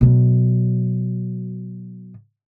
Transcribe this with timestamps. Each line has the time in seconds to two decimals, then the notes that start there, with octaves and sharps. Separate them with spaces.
0.01 B2 F#3